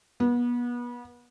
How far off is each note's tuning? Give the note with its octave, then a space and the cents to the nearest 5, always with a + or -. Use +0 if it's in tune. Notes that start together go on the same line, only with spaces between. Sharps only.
B3 -30